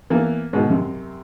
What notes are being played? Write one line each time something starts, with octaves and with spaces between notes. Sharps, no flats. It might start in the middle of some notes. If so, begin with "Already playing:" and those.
E3 A#3 B3
G#2 B2 D#3
F#2 C3